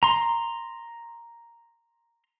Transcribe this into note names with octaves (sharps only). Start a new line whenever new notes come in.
A#5 C6